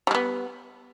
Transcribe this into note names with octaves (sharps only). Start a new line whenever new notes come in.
G3 G#3 B3